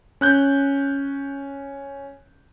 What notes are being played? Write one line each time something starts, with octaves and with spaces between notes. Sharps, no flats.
C#4 F#6 G6